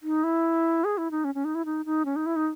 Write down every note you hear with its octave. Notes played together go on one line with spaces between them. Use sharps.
D#4
E4
G#4
E4
D#4
C#4
C#4
D#4
E4
D#4
D#4
C#4
D#4
E4
D#4